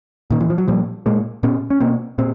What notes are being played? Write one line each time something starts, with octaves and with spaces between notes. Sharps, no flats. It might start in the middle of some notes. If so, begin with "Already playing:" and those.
A#2 D#3
E3
F3
F#3
A#2 F3 G3
A#2 G#3 A#3
A#2 B3 C#4
C#4
B2 A#3 C4
A#2 C4